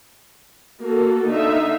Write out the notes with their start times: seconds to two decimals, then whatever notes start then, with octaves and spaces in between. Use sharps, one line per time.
0.81 A#3 F#4 A4
1.27 D3 D#4 E5 F5